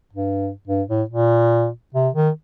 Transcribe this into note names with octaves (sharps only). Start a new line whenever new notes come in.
G2
G2
A2
A#2
C3
D#3